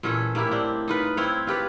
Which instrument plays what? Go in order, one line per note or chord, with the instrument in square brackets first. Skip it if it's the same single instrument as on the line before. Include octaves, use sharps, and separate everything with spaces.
[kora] A#2 E3 C#4 A4
A2 A#3 E4 G4
C4 D4
D#4 F4 B4
C4 E4 C#5 F5
F4 G4 B4 C#5